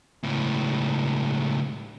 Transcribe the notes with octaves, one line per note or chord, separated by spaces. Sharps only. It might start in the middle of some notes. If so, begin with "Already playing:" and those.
C#2 A2